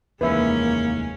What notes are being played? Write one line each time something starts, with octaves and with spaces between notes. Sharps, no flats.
F1 D#2 E3 G#3 A#3 C#4 B4 E5